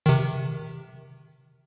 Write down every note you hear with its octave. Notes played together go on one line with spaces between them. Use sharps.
C3 D#3